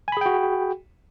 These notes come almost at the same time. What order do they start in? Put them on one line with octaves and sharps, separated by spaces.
G#5 B5 G#4 G5 F#4